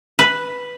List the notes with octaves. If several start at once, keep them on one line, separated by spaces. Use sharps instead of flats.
B4